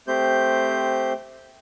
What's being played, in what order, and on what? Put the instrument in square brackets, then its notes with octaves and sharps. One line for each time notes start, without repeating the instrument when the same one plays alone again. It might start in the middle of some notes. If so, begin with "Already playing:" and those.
[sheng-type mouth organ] A3 C4 G4 C5 G6